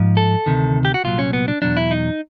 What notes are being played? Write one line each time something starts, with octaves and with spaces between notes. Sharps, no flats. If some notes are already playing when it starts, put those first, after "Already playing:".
Already playing: G#2 F3
A4
D2 C3 D#3
G4
F#4
C2 A#2 F#3 F4
C#4
B3
D4
E2 B2 F#3 D4
E4
D#4